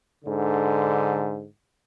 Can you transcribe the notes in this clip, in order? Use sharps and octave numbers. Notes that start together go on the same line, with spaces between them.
G#2 D3